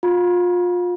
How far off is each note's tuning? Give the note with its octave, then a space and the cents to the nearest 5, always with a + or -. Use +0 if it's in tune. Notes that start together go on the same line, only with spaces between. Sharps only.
F4 +30 B5 -45